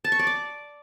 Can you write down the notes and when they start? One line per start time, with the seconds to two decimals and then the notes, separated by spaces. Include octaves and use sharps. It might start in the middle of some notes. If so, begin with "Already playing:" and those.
0.04 A5
0.12 C#6
0.19 D5
0.27 D6